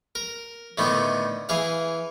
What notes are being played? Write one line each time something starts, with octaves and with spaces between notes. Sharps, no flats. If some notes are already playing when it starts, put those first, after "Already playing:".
A#4
A2 D3 D#3 B3
E3 G#4 F5